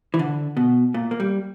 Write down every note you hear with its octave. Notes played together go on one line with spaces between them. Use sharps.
E3
D3
B2
A#2
A#3
G3